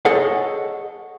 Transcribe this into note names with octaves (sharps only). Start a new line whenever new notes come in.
G#4 A4 C#5 D#5 F#5